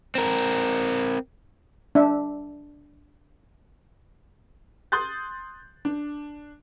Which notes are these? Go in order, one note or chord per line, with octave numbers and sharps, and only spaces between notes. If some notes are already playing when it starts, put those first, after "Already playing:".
C4 A#4
D4 E5
C6 D#6 F#6 G6 A6
D4